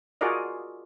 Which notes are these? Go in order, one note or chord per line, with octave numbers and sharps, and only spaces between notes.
F4 F#4 G#4 A#4 D5 D#5